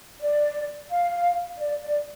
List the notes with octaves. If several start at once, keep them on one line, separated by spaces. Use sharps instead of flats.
D5
F5
D5
D5